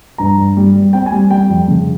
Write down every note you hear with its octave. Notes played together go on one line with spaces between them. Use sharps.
G2 A#5
G2
G3
G3
C4 G5
G#5
G3
G3 G5
F2
C#3